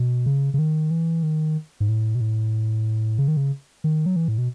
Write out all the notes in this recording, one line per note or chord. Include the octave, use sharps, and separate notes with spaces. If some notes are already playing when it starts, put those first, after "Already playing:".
Already playing: B2
C#3
C#3
D#3
E3
D#3
G#2
A2
B2
A2
C#3
D#3
C#3
D#3
F#3
E3
A2
B2